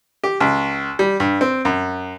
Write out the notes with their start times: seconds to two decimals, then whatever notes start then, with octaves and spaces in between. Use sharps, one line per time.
0.24 G4
0.40 C#2
0.99 G3
1.20 G2
1.41 C4
1.65 F#2